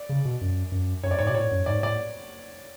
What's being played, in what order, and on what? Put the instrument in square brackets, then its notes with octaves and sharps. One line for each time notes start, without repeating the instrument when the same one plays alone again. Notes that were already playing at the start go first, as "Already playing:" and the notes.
Already playing: [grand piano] D5
[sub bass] C#3
B2
F#2
F#2
[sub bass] F#2 [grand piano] C#5
[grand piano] D5
[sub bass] G#2 [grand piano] C#5
[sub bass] B2 [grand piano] D5
[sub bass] A2 [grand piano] C#5
[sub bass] F#2
[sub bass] G#2 [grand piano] D5
[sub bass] A2 [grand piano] D5